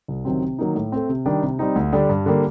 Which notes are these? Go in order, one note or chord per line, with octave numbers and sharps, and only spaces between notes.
C2
C3 D#3 F#3 C4
C3
D#3 F#3 A#3 D#4
A2
A3 C4
C3
D#3 G3 D4
C3
G3 C4 D#4
D2
D3 G3 D4
G2
D3 G3 A#3